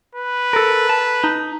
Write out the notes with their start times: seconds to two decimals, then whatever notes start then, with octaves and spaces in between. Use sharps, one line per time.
0.15 B4
0.53 A4 A#4
0.89 A5
1.24 D#4